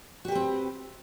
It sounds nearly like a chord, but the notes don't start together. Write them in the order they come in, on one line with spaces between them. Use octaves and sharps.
F#4 G4 B4 C4